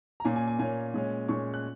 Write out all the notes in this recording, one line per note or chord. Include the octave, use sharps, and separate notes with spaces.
A#5
A#2 A#3 C#4 G#5
G#5
G#5
A#2 A#3 C#4 G#5
A#2 G#3 C#4
A#2 G#3 C#4 C#6
F#6